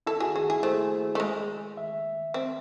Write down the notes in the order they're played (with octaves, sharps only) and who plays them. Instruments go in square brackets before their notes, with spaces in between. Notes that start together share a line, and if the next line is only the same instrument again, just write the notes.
[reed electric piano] E4 [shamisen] A4
[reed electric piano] F#4 [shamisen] G#4
[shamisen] F#4 [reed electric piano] G#4
[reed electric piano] E4 [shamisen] G#4
[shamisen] A3 [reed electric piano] C5
[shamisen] A3
G#3
[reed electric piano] E5
[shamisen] C4